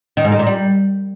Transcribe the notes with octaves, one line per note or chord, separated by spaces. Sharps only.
D#3
G#2
D#3
A#2
G3